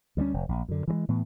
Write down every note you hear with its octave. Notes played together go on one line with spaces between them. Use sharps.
D2 G3 A3 C#4
F1
A#1
F#2 D3
E3 F3 G#3
A2 E3 B3